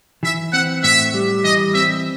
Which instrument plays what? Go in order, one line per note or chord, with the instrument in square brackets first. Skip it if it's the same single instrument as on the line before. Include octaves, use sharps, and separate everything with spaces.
[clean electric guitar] E3 [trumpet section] E5
[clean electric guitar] C4 [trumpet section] F#5
[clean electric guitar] A2 [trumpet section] E5
[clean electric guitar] G3
[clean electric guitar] E3 [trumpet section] D#5
[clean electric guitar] C4 [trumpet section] E5